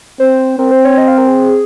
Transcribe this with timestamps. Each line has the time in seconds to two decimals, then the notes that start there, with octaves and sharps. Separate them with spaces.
0.20 C4 C5
0.59 C4 A#4
0.72 C5
0.85 C#5
0.98 D#5
1.08 F5
1.18 A#4
1.28 G#4